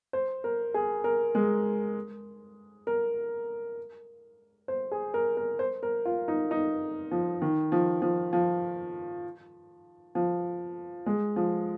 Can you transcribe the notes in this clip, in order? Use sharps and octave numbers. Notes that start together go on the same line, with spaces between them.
C5
A#4
G#4
A#4
G#3
A#4
C5
G#4
A#4
A#4
C5
A#4
F4
D#4
D#4
F3
D#3
F3
F3
F3
F3
G#3
F3